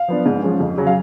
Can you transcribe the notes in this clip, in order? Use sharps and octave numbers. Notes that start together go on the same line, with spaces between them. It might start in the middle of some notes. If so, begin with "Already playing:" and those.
Already playing: F5
F3 B3 D4
G#2
F3 G#3 C#4
F2
C#3 F#3
F5